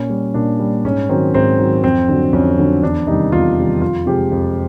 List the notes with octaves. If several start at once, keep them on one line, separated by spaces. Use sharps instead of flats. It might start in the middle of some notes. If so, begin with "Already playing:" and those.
Already playing: A#2 C#4
G3
A#2 D4
G3
G#2 C#4
D#3 F#3 C4
G#2 C4
D#3 F#3
F2 C4
D3 F#3
F2 C#4
D3 F#3
E2 D4
C3 D#3 G3 D#4
E2 F4
C3 D#3 G3
F2 F4
C3 F3 G#3 G4
F2